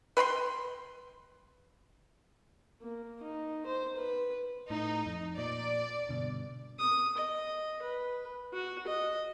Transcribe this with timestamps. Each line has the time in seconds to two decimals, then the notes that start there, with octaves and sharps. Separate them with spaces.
0.17 B4 G5 B5 C6
2.81 A#3
3.22 D#4
3.66 C5
3.96 B4
4.70 A2 D#4
5.06 F2
5.38 A#2 D5
6.09 G2 B2 D3
6.79 D#6
7.18 D#5
7.83 B4
8.53 F#4
8.87 D#5